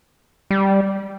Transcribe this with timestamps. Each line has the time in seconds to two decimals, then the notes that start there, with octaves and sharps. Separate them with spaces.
0.51 G3